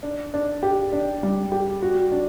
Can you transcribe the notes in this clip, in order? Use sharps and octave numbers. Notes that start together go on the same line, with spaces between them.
D4
D4
G4
D4
G3
G4
F#4
D4